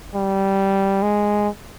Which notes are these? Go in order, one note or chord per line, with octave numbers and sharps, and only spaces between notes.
G3
G#3